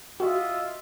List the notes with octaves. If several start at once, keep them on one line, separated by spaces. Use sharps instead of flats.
F4 F#4 D#5 E5